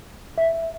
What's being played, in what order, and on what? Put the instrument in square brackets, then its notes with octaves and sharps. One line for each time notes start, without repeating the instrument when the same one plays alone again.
[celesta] E5